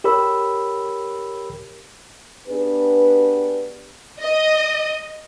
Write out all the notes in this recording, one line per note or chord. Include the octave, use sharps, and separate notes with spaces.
G4 A#4 C#5 B5 E6
B3 D4 G4 G#4 B4
D#5